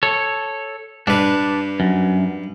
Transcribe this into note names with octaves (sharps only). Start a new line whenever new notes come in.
A4 C#5
G2 D4 B4
F#2